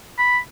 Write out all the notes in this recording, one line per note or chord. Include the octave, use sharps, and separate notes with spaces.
B5